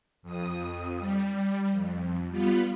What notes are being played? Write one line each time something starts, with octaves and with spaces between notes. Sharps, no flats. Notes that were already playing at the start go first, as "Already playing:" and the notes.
F2 D#6
G3
F2
G3 B3 F4 B5